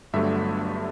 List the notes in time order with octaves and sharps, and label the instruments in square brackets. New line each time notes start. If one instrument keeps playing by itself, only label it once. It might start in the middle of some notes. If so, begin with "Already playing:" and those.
[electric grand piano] G1 G2 D3 F#3 A3 E5